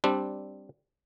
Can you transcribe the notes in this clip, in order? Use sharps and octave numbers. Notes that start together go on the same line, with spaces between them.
G3 C4 D4